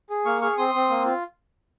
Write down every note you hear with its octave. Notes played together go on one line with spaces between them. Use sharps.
G#4
A#3 C#6 F6
G#4 C#6 F6
C4 C6 D#6
C4
A#3
F4